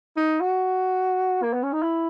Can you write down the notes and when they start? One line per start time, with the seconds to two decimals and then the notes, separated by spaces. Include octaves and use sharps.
0.17 D#4
0.40 F#4
1.43 A#3
1.53 B3
1.63 C#4
1.73 D#4
1.83 E4